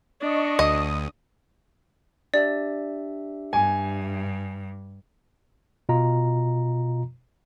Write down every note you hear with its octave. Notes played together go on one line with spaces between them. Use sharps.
D4 D#5 C#6
D2 D#5 D#6
D4 G4 D5 E5
G2 G#5
B2 F4 D#5 A#5